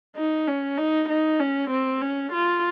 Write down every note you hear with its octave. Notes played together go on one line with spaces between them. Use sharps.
D#4
C#4
D#4
D#4
C#4
C4
C#4
F4